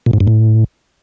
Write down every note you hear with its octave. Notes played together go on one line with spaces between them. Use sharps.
A#2
G#2
G2
A2